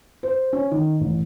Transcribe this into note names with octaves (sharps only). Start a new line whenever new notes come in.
C5
C#4
D#3
A1